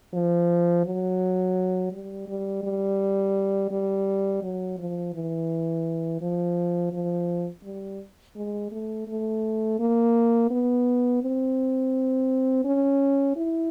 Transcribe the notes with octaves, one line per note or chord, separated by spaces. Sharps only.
F3
F#3
G3
G3
G3
G3
F#3
F3
E3
F3
F3
G3
G#3
A3
A3
A#3
B3
C4
C#4
E4